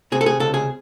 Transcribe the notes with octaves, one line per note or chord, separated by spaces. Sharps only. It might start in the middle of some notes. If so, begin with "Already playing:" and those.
C3 G#4
A4
G#4
C#2 A4
G#4